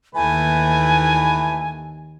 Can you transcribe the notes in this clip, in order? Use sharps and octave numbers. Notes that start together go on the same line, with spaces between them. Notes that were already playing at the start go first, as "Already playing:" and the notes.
D#2 E3 A3 B4 G#5